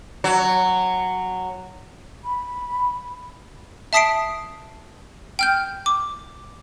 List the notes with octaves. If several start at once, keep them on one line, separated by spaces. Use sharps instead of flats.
F#3
B5
E5 A5 D#6 B6 C7 D7
G5 F6 G6
D6